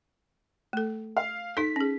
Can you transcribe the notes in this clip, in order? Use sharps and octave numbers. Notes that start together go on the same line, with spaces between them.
A3 A4
F5
D#4 A4 B6
C#4 G#4